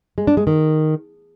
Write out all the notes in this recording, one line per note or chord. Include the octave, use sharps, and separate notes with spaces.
G#3
D4
G#3
D#3